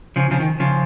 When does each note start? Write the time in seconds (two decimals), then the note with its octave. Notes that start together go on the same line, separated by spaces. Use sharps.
0.16 C#3 F3
0.31 C#3 F3
0.40 D#3
0.60 C#3 F3